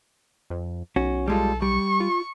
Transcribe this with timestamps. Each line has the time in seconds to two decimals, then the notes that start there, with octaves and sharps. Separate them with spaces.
0.50 F2
0.96 B1 C#4 F#4
1.28 G3 G#3 F4 A4
1.62 G3 C#6
2.00 F4